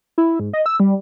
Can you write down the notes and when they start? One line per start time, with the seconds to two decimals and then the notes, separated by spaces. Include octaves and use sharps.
0.18 E4
0.40 G#2
0.53 D#5
0.66 E6
0.80 G3